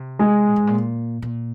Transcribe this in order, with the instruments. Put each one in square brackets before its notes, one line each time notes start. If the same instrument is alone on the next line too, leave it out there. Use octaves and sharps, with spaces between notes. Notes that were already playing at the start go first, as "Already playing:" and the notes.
Already playing: [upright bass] C3
[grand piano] G#3
[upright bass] A#2
G#2
A#2
A#2